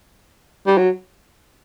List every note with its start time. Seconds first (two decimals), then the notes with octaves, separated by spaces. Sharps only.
0.67 G3
0.78 F#3